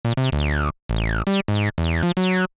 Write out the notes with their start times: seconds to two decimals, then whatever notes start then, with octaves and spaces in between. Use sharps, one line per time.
0.05 A#2
0.17 C3
0.32 D2
0.89 A1
1.27 G3
1.48 G#2
1.78 E2
2.03 F3
2.17 F#3